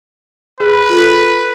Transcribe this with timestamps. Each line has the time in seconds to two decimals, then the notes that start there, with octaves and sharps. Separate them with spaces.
0.60 G#4 B4
0.90 F4 A4